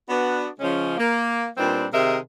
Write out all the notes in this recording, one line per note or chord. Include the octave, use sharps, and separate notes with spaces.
B3 D4 F#4
C#3 F3 G#3 C#4
A#3
A#2 G3 B3 C4 D4 D#4
C3 D#3 G#4 A#4 D#5 E5